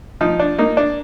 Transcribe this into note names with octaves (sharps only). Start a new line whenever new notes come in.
F3 D#4
D4
A#3 D#4
D4